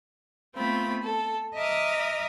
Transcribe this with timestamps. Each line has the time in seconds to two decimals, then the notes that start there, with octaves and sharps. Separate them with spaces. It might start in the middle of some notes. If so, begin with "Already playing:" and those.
0.56 A3 B3 C4 F4 B5
1.02 A4
1.55 D#5 E5 A#5 D6 D#6 F6